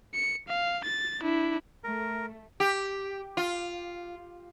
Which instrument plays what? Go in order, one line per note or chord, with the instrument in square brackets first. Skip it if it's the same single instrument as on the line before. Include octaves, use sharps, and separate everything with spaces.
[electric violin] C#7
F5
A6
D4 E4
[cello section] A3 [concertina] A#4
[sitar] G4
F4